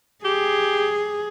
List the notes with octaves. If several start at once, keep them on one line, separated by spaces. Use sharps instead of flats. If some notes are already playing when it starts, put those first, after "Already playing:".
G4 G#4